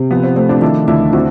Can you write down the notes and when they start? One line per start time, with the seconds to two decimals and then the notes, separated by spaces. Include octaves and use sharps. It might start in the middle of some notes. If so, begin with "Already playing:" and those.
Already playing: C3 C4
0.11 F3 B3
0.23 C4
0.36 A3 C4
0.49 C4 D4
0.62 D#3 D4 E4
0.87 D2 D4 E4
1.13 C4 E4 F#4